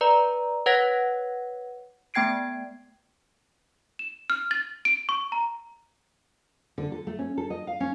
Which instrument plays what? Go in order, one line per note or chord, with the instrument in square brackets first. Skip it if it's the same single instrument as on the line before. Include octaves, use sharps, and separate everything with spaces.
[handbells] B4 D5 A#5
B4 C#5 F#5 G#6 A#6 B6
A3 B3 G5 G#6 C7 D7
[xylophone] E7
F6
A6
D7
C#6
A#5
[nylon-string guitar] D3
A4
A3
C#4
A4
D#5
F5
C#4